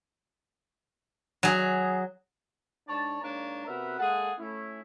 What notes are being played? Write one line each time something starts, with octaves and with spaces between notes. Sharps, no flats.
F#3 G#4
G#2 D4 C#5 D5 A5
G#2 A#3 D4 C#5 A#5
C3 B3 F#4 A#4 B4 E5
G#3 A#3 G#4 A4 F#5
A3 C#4 E4